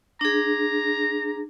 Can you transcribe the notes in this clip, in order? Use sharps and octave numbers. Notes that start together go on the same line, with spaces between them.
D4 G#4 A#5